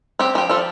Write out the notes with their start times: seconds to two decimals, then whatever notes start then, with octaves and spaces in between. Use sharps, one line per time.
0.19 C4 G4
0.35 F3 G4
0.49 F3 F4 A4